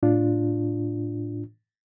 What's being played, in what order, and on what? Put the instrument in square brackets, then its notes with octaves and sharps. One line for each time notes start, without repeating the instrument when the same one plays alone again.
[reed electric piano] A2 D4 F4